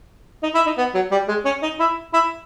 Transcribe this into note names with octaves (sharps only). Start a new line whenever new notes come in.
D#4
E4
D#4
B3
F#3
G3
G#3
C#4
D#4
E4
E4